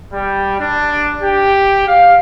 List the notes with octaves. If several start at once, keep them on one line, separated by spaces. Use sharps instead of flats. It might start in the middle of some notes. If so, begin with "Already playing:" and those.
G3
D4
G4
F5